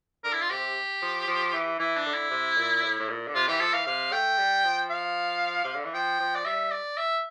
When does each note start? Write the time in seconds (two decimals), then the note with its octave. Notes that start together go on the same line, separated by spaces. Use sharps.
0.24 D3 A#4
0.33 E4
0.42 F4
0.50 C3 G4
1.02 F3
1.27 F3
1.53 E3
1.79 E3 E4
1.97 D4
2.06 D3
2.14 E4
2.30 C3
2.57 A#2
2.83 A2
2.99 A2
3.09 A#2
3.28 D3
3.35 C3 F4
3.47 E3 G4
3.60 F3 A4
3.73 E3 F5
3.86 C3 F5
4.12 A3 G5
4.38 G3
4.64 F3
4.90 F5
5.64 C3
5.75 D3
5.85 E3
5.94 F3 G5
6.20 F3
6.35 D5
6.45 G3 E5
6.71 D5
6.97 E5